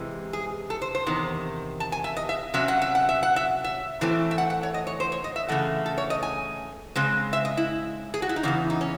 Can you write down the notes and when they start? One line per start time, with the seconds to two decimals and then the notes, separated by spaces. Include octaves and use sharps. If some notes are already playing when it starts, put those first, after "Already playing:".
Already playing: C3 E3 G#3
0.33 G#4
0.70 A4
0.82 C5
0.95 C5
1.07 E2 C3 D#3
1.80 A5
1.92 G#5
2.04 E5
2.17 D#5
2.29 E5
2.54 C3 F#3 C#4 E5
2.68 F#5
2.82 E5
2.95 F#5
3.09 E5
3.23 F#5
3.36 E5
3.64 E5
4.01 A2 E3 A3 C4
4.31 E5
4.38 F#5
4.50 F#5
4.63 C#5
4.74 D#5
4.87 C#5
5.00 C5
5.12 C#5
5.24 D#5
5.36 E5
5.48 C#3 E3 A3 F#5
5.86 A4
5.98 C#5
6.10 D#5
6.23 G#5
6.96 C#3 G#3 C4
7.33 E5
7.45 D#5
7.57 E4
8.14 G#4
8.22 F#4
8.29 E4
8.36 D#4
8.43 E2 C#3 E3 C#4
8.70 D#4
8.81 C#4